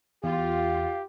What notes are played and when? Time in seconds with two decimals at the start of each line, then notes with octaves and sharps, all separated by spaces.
0.24 E2 F4 G4 F5